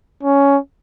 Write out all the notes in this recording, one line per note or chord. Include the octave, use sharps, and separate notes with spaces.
C#4